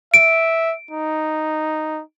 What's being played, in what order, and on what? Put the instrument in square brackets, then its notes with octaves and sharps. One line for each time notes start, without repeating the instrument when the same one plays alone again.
[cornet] E5 [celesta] D7
[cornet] D#4